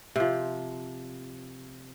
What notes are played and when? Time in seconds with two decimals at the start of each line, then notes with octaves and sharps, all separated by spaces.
0.16 C3 F3